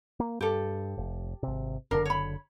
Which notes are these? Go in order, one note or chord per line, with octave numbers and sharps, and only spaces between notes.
A#3
G2 G4 A4
F1
G#1 C3
F#1 D3 D4 A#4
C#5 B5